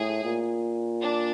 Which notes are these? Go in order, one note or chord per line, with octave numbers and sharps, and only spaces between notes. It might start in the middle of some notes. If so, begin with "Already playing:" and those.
Already playing: A2 G#4
A#2
D4